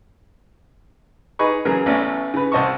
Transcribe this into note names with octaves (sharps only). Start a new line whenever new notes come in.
D#4 G#4 B4 C#6
C#3 E3 F#3 G#4 A#4
A1 E2 E3 A3 C#4 D5
C#3 B4
C2 C5 D#5 A5 C#6